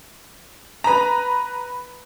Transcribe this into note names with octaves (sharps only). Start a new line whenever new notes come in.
B4 A#5